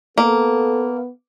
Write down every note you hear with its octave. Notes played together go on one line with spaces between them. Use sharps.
A#3 B3 A4